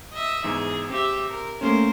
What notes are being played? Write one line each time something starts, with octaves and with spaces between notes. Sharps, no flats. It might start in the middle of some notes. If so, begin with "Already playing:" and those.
D#5 E5
E2 G#2 G#4
C4 G4 E5
A#4
A3 A#3 C#4 A#4 C5